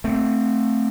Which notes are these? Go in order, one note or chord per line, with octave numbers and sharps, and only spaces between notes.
A3 C4